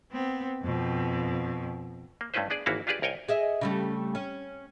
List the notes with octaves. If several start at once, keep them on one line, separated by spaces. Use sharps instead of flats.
B3 C4
F2 B2
A#3
G2 A3 C#4 E4 B4 C5
B3 D4 G#4 D5
G#1 E3 A#3 E4 F#4 F5
D4 F4 G4 G#4 B4 D5
C2 A#4 C#5 G5 G#5
G#4 D#5 E5
C#3 G3 A3
C#4